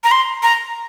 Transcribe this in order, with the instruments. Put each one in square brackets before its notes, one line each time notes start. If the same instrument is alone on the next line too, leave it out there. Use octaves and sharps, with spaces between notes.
[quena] A#5
C6
A#5